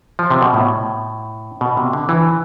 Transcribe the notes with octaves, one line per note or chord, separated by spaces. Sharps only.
F3
C3
B2
A2
B2
C3
D3
E3